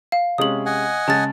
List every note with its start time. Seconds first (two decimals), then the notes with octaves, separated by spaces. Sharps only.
0.12 F5
0.38 C3 G#3 C#4 D#6 F#7
0.66 D#5 F#5 G#5
1.08 C#3 G#3 A5 A6